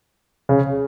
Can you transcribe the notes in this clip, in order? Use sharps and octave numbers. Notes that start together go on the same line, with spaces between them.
C#3